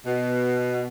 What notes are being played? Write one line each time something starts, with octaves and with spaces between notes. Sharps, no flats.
B2